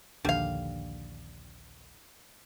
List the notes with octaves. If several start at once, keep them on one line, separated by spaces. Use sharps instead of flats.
A#1 D#2 D3 G3 F5